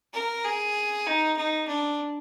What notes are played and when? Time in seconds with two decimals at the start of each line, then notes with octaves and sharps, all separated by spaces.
0.14 A#4
0.44 G#4
1.06 D#4
1.37 D#4
1.67 D4